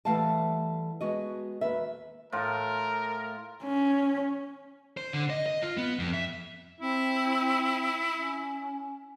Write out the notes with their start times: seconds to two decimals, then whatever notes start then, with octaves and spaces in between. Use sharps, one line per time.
0.05 E3 G3 A3 F5 F#5 A5
1.00 G#3 B3 F#4 D#5
1.61 D#2 B4 E5
2.32 A2 F4 A#4
3.64 C#4
4.97 C5
5.13 D3
5.30 D#5
5.46 D#5
5.62 F4
5.78 B3
5.99 F2
6.14 E5
6.81 C4 E4
8.19 C#4